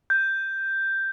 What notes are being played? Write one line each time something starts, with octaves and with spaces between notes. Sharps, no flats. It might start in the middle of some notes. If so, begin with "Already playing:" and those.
G6